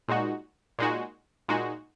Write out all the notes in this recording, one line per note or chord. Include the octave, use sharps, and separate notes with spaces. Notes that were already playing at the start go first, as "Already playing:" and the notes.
A#2 G#3 D#4 F#4
A#2 G#3 D#4 F#4
A#2 G#3 D#4 F#4